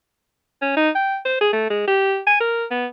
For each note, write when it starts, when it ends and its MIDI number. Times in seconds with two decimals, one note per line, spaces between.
0.62 0.77 61
0.77 0.90 63
0.95 1.18 79
1.25 1.39 72
1.41 1.50 68
1.53 1.66 57
1.70 1.86 56
1.88 2.20 67
2.27 2.40 80
2.41 2.65 70
2.71 2.87 59